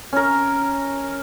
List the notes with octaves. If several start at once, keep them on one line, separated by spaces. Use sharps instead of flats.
C#4 A#4